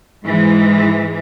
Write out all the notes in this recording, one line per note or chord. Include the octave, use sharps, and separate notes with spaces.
G#2 E3 G#3